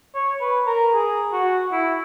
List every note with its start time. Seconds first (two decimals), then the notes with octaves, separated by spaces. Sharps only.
0.15 C#5
0.41 B4
0.67 A#4
0.94 G#4
1.32 F#4
1.72 E4